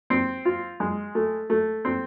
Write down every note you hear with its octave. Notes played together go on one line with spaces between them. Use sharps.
C4
F4
G#3
A3
A3
C4